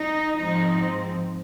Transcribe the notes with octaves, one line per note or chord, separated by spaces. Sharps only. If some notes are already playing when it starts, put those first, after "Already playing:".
Already playing: D#4
G#2 F3 C4 D#4